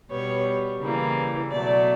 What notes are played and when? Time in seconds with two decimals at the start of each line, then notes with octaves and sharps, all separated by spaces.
0.11 B2 G3 B3 C#5
0.82 C#3 E3 G3 A#3
1.51 B2 F#3 A3 D5